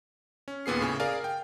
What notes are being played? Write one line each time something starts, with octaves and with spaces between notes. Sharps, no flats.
C#4
D#2 A#2 B3 G#4 C7
A2 C#3 G#5
G#4 A#4 D5 F5 G#5
G5